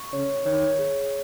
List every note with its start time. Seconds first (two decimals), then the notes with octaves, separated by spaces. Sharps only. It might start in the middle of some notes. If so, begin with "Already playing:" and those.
Already playing: C#6
0.13 C#3 C#5
0.45 D#3 C#5
0.79 G#4